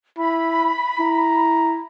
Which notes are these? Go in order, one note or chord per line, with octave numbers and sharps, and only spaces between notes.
E4 B5
E4 A#5